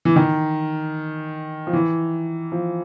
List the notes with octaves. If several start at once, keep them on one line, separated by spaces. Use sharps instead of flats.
E3
D#3
F3
E3
F3